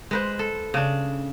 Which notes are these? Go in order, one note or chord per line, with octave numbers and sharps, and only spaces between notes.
G#3 B4 C5
A4
C#3 D4